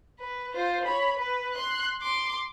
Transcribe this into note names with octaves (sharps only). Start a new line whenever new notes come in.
B4
F4 C5
C#5 B5
B4
C6 F#6
C6 D6